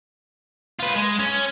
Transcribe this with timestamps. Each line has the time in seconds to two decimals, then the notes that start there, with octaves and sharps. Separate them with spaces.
0.80 F4 B4
0.96 G#3
1.19 C#4